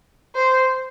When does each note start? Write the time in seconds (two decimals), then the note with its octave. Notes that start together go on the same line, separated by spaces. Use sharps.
0.35 C5